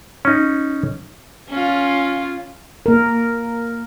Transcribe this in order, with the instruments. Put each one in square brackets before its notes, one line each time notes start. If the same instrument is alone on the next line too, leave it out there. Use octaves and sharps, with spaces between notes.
[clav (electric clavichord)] C#4 D#4
[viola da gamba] C#4 F4
[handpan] A#3 A#4